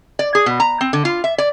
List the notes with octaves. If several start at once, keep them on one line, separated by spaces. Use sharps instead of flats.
D5
G#4
B2
A#5
C4
D3
F4
E5
D5